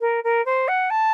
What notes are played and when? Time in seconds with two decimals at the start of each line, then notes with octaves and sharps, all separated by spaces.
0.01 A#4
0.24 A#4
0.45 C5
0.68 F#5
0.90 A5